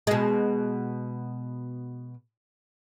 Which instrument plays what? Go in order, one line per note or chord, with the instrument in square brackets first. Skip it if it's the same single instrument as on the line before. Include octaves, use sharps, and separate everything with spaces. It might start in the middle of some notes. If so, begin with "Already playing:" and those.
[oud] B2 G#3